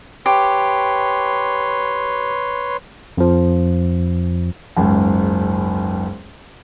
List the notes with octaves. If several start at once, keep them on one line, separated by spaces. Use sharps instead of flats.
G4 B4 C#5 C6
F2 F3
F#1 C#2 G#2